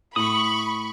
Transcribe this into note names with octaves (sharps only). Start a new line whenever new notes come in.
A2 B5 C#6 D#6 F#7